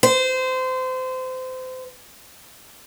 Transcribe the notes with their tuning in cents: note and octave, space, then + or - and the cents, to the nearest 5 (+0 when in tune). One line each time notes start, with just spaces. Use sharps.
C5 -25